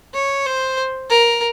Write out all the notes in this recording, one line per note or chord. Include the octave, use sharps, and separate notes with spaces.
C#5
C5
A#4